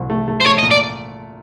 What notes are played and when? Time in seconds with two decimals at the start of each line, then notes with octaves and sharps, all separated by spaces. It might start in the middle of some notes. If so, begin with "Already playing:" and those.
Already playing: C2 A#2 F#3
0.10 A3
0.28 A3
0.40 C5
0.45 A3 C#5
0.59 D#5
0.63 A#2
0.71 D5